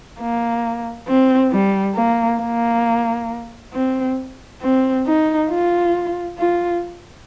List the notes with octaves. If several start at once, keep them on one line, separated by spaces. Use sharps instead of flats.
A#3
C4
G3
A#3
A#3
C4
C4
D#4
F4
F4